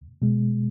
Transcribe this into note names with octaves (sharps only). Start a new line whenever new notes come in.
B2 G#3